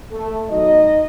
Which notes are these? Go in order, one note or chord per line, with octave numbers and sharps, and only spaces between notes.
A3 A4
B2 F#3 A3 D#4 D#5